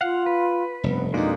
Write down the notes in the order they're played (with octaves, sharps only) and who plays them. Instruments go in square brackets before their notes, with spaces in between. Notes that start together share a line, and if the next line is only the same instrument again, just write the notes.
[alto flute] F4 [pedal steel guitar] F5 F#5
[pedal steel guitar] B4
[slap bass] F1 G2 [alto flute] B3
[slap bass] F2 B2 [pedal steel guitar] G#3 A#3 D4 [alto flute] D#4